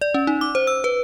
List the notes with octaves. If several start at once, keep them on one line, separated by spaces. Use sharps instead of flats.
D5
C#4
D#4
D6
C5
E6
B4